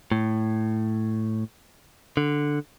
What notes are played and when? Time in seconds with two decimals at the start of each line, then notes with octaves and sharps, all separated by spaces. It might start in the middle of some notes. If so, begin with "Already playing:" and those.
0.12 A2
2.17 D3